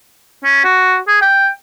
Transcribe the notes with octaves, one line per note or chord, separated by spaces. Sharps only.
C#4
F#4
G#4
G5